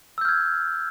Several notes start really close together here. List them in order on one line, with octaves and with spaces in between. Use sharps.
E6 G6 F6 G#6